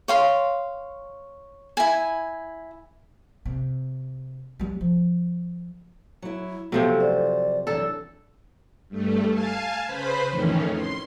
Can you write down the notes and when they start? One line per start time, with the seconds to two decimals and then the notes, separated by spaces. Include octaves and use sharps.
0.08 C#5 F5 C6
1.77 E4 G#5
3.45 C3
4.59 G3 F4
4.81 F3
6.22 F#3 E4
6.72 C3 F3 F#3 A3 B3
7.00 C5 D5
7.67 F#2 E3 D4 A4 D5
8.89 G2 A3
9.30 F5 G#5 A5
9.86 C#3 B4 C5 B5
10.30 F2 A2 D#3 E3 C#4
10.73 C6